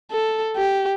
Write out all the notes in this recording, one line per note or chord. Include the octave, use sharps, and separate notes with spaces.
A4
G4